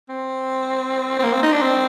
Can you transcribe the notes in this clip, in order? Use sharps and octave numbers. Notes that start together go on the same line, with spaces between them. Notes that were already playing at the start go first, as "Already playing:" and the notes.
C4
C4
A#3
C4
D#4
D4
C4